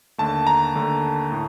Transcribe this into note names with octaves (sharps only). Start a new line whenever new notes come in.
D#2 D3 A3 A5
A#5
D#2 D3 A3
A2